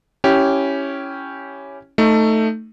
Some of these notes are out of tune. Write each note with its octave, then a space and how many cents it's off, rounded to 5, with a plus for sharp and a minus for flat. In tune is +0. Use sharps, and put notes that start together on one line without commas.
C#4 +0 E4 +0 G4 -10
A3 +10 D#4 +0